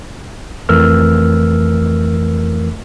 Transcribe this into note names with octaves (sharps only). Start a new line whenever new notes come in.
F2 E3 A3 A#4 E6 F6